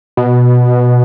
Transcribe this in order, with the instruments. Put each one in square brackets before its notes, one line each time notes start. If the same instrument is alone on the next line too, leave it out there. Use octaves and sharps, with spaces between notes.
[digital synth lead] B2